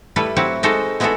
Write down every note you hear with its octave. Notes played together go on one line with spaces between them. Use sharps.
G3 A3 E4 A4 B4
F#3 C4 E4 F#4 G4
G#3 D#4 F#4 A4 C5 D#5
G#3 B3 E4 F#4 G#4 A4